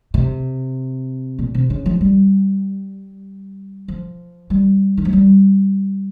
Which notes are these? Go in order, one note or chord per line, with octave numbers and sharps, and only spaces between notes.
C3
A#2
C3
C#3
F3
G3
F3
G3
D#3
F3
G3